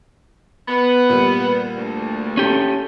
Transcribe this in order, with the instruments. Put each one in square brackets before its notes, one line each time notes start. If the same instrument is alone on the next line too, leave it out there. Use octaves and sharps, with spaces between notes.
[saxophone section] B3
[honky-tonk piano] A#2 G3
[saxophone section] D2
[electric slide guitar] C#4 G4 A4